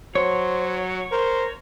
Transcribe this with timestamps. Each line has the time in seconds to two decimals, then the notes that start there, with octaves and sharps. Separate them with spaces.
0.15 F#3 C5 C#5
1.12 A#4 C5